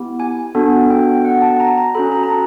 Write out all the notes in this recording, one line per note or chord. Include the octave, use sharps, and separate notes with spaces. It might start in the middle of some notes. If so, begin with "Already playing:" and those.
Already playing: B3 E4 G4
G#5
B3 D4 F#4 A4
G5
F#5
A5
A#5
A#5
C#4 F#4 A4 B5
A#5
A#5
A5